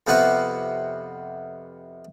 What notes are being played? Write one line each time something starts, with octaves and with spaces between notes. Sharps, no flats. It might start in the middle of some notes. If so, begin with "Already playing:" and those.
F2 C3 B3 F4 F#4 C#6